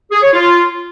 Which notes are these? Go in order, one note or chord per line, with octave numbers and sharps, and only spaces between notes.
G#4
C#5
F4